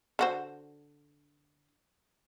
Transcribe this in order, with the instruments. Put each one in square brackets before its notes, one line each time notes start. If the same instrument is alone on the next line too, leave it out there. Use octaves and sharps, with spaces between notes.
[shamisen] D3 F#4 C5